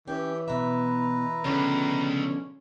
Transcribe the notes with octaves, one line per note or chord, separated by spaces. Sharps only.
E3 C#4 G4 G5
B2 E4 B4 E5 A#5
C#2 B2 D3 F3 C#4